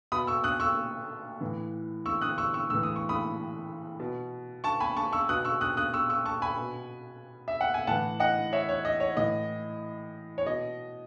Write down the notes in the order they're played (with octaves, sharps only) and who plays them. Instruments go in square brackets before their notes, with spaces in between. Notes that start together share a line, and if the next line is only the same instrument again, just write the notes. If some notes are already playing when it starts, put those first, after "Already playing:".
[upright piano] B2 B5 D#6
C#6 E6
D#6 F#6
C#6 E6
A2 E3
C#6 E6
D#6 F#6
C#6 E6
C#6 E6
A2 E3 E6
D#6
C#6
B5 D#6
B2
A5 C#6
G#5 B5
A5 C#6
C#6 E6
B2 D#6 F#6
C#6 E6
D#6 F#6
D#6 F#6
C#6 E6
C#6 E6
A5 C#6
G#5 B5
B2
E5
F#5
G#5
A2 E3 F#5 A5
D#5 F#5
C#5 E5
C#5
D#5
C#5
A2 E3 D#5
C#5
B2 D#5